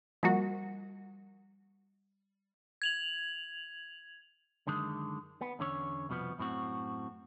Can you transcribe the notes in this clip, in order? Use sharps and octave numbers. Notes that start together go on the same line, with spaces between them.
F3 G3 A#3 F#4
G#6 F7 F#7
F#2 D3 D#3 G#3
B3
E2 D3 C#4 C#5
C2 F2 B2 F3 B3
F#2 A2 C4 F#4